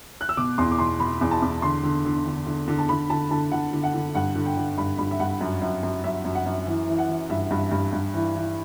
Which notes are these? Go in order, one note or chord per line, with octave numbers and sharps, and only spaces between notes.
F#6
E6
B2 D6
E2 C6
D6
B2 C6
B2 B5
E2
A5
E2
D3 C6
D3
D3
D3
D3
D3
A5
D3 B5
D3 A5
D3 A5
D3 F#5
D3
F#5
D3
G2 F#5
D3
G5
D3
G2 B5
G2 B5
E5
G2 F#5
F#2
F#2
F#2
F#2 E5
F#2
F#5
F#2
E3
E3
F#5
E3
G2 E5
G2
G2
G2
E3
E3